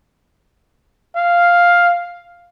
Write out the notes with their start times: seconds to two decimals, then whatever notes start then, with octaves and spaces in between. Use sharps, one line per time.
1.16 F5